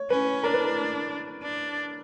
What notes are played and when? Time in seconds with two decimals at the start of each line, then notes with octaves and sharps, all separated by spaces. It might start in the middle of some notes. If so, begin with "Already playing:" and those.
Already playing: C#5
0.10 C#4 B4
0.43 D4 A#4
0.54 B4
0.65 A#4
1.43 D4